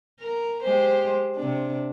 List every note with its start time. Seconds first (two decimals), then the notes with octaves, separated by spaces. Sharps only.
0.20 A#4
0.63 G#3 G4 C5
1.36 C3 D4